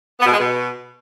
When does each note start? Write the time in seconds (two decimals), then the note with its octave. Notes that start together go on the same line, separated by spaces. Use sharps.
0.20 B3
0.26 B2
0.32 G#3
0.39 B2